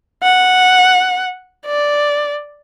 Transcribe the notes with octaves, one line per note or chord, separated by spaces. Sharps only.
F#5
D5